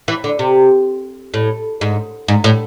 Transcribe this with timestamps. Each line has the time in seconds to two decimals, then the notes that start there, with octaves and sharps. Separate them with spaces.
0.08 E3
0.24 D3
0.39 C3
1.34 A2
1.81 G#2
2.28 G#2
2.44 A2